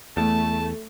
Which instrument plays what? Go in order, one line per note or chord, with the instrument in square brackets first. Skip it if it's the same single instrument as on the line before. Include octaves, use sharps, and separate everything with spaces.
[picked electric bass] E2 [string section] A3 [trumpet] A5